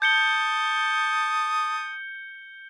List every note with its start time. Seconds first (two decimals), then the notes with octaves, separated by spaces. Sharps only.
0.02 A5 D#6 G6 C#7 G7